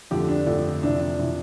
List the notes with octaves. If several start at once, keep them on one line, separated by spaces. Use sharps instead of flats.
F2 D3 F3 A3 G4
D4
F2 D3 F3 A3
F2 C3 E3 D4
D4
C3 E3